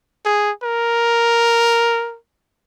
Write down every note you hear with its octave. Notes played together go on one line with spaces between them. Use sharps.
G#4
A#4